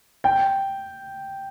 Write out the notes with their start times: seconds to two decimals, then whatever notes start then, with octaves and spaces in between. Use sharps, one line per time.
0.24 G5